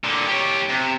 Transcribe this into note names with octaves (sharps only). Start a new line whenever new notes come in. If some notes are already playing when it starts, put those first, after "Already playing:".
A#2 D3
G4 C#5
C3